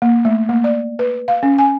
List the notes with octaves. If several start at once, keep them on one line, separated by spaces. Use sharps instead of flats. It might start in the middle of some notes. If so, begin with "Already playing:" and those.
A#3
A3
A#3
D5
B4
F5
C#4
G#5